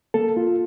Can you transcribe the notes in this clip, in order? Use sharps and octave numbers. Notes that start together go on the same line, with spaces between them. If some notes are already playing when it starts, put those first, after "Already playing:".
A#3 A4
F4